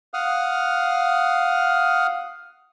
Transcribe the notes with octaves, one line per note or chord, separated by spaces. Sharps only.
F5 F#5 D#6 F6